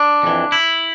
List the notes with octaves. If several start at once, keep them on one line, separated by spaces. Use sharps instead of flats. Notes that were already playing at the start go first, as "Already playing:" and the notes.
Already playing: D4
F2 E3
E4